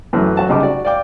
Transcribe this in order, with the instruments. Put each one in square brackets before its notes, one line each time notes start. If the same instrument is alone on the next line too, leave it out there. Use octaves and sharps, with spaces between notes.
[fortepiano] F#2 E3 F#3 A3
F#3 F#4 A5
C2 C#3 D#4 A5 B5 D6
F#4 D5
D5 F5 G5 D6